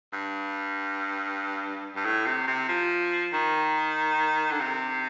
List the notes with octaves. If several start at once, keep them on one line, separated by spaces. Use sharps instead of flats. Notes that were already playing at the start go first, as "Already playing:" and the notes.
G2
G2
A2
C3
C3
F3
D#3
D3
C3